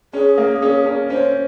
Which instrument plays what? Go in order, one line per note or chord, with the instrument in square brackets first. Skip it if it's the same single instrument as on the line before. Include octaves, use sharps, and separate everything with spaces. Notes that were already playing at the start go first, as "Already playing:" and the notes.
[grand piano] C#4 [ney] G#4
[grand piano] A#3
C#4
C#4
[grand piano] C#4 [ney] C5